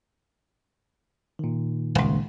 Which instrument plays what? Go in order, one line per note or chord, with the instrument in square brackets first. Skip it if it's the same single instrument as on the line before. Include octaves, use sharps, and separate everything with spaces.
[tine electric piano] A#2 D#3
[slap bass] D#1 C#2